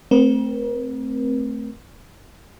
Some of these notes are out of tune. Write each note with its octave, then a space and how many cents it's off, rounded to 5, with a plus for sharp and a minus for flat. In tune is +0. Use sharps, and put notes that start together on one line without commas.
A3 +0 C4 -5 A#4 +40